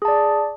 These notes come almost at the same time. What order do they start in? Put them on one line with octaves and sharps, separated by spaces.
G#4 A5 D5